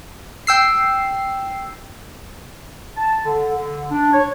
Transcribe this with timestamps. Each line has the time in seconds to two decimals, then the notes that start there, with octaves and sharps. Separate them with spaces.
0.47 G5 E6 C7
2.96 A5
3.25 D3
3.54 D3
3.91 D4
4.12 C#5